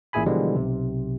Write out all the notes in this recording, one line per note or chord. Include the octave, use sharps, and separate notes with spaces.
A1 A#2 E4 G#4 G#5 B5
B2 D3 E3 F3 G3 G#3
B1 C3